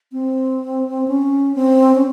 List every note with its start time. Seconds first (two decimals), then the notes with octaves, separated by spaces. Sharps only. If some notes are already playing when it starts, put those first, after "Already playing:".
0.13 C4
1.08 C#4
1.55 C4
1.95 C#4